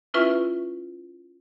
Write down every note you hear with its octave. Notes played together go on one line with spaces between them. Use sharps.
C#4 E4 F4 B4 E5 C#6